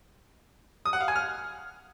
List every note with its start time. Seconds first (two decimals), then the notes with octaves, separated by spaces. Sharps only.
0.85 D#6
0.93 F#5
1.01 F5
1.08 G#5
1.16 F6